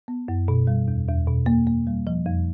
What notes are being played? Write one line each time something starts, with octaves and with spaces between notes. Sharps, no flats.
B3
F#2
B2
G3
E2
E2
B2
A#3
A#3
G3
F3
F2